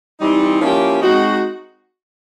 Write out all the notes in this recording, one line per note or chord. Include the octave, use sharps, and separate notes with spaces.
E3 G3 C4 D#4
F3 A#3 C#4 E4 G4
G#3 C4 D#4 F#4